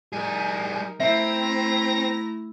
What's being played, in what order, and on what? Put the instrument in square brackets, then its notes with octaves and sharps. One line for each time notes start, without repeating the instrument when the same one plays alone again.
[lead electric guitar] G3 G#4 [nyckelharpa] D#4 A#4
[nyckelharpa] A3 E4 [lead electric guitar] C4 [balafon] E5 [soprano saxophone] A#5